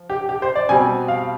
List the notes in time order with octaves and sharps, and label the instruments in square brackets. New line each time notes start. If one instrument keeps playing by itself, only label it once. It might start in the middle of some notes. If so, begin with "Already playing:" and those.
Already playing: [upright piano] F3
G4
G4
C5
D5
B2 G3 C4 G#5
F5